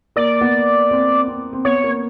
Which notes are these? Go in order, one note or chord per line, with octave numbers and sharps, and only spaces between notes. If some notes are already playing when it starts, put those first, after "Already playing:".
A#3 D5
B3
C4
C4
C4
B3 C#5
A#3